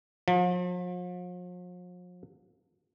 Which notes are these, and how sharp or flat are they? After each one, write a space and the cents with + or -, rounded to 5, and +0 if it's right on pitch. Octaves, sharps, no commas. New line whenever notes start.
F3 +45